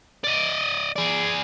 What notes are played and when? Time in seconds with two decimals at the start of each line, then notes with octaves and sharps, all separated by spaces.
0.24 D5 D#5
0.96 G#4 D5